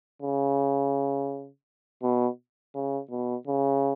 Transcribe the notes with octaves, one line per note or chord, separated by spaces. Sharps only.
C#3
B2
C#3
B2
C#3